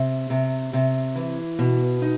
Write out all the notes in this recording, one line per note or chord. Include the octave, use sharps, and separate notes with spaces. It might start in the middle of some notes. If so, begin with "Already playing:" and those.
Already playing: C3
C3
C3
E3
B2
D#4